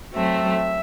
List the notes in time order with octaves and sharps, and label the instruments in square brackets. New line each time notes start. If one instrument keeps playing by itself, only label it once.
[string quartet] F#3 A3 C4 [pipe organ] E5